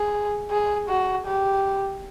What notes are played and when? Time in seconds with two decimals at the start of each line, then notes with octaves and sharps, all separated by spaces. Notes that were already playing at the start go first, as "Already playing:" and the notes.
Already playing: G#4
0.50 G#4
0.88 F#4
1.26 G4